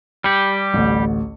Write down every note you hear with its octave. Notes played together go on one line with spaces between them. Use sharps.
G3 G4 C#7
A1 D2